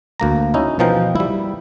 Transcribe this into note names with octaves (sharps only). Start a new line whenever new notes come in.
D2 A#3 A#5
C#4 D#4 E4
B2 E3 F3 D#4 A#4 G5
G3 E4